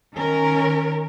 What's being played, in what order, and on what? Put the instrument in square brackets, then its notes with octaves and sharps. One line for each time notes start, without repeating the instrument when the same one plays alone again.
[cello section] D#3 C#4 A#4